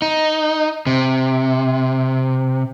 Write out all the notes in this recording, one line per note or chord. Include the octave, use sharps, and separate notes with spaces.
D#4
C3